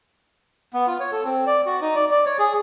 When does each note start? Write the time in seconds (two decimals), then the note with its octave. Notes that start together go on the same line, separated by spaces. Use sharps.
0.74 B3
0.87 F4
1.00 C#5
1.12 A4
1.24 C4
1.47 D5
1.66 F#4
1.81 D#4
1.95 D5
2.11 D5
2.26 C#5
2.39 G#4